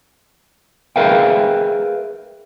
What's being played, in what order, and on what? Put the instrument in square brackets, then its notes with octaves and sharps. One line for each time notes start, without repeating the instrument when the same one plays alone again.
[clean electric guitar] G#4 A#4 B4 E5 F5 G5